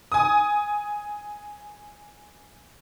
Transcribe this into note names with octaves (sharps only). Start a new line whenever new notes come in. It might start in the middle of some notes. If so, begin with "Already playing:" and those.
G#5 D#6